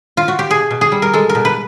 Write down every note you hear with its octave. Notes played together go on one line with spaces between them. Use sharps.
F4
F#4
G4
B2 G#4
B2
G#4
G3
A#4
G#3 A4
A#4
B2
B4